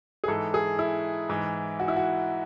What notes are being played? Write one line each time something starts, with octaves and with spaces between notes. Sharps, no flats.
G#4
G#2 E3 A4
G#4
E4
G#2 E3
F#4
E4
F#4